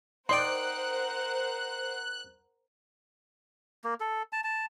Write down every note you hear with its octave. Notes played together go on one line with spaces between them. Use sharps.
D#4 A#4 C5 D5 F#5 G5 C6 F#6
A#3
A4
A5
A5